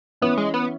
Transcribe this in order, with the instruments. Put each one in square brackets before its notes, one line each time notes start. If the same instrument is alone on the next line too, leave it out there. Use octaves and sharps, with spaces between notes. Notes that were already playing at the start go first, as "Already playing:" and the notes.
[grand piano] E3 C#4 E4 C#5 [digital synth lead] B3
[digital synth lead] G#3
B3